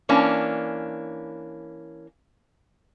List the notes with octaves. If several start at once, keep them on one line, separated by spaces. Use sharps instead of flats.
E3 A#3 C#4 D4